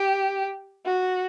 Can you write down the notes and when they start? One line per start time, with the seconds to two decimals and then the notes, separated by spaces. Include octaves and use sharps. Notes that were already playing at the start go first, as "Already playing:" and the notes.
Already playing: G4
0.85 F#4